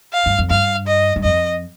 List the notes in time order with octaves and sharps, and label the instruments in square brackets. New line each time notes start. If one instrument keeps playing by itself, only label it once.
[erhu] F5
[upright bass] G2
F2
[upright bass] G2 [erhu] F5
[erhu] D#5
[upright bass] G2
[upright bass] F2 [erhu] D#5